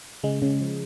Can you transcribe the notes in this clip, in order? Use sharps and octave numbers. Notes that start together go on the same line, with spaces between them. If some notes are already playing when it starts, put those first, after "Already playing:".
C#3 G#3
C#3
F3